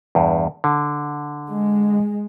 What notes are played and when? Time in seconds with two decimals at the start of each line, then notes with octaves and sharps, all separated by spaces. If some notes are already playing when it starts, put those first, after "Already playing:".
0.15 E2 G2
0.64 D3
1.48 G#3